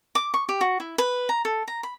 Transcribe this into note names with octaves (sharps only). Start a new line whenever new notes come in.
D6
C#6
G4
F#4
E4
B4
A#5
A4
A#5
B5